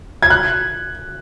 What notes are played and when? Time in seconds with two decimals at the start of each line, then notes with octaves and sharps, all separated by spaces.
0.23 G#6
0.30 F#6